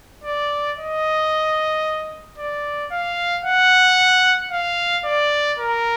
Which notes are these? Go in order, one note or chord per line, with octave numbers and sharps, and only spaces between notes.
D5
D#5
D5
F5
F#5
F5
D5
A#4